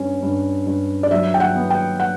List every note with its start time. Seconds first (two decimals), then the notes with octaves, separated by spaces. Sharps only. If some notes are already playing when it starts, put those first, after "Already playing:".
Already playing: G2 C#4
0.23 G2
0.67 G2
1.03 D5
1.11 F#3 E5
1.34 G5
1.40 F#5
1.56 B3
1.70 G5
2.00 F#5